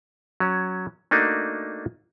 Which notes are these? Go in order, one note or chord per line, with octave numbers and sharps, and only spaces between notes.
F#3 C#4
A3 A#3 D4 D#4 F#4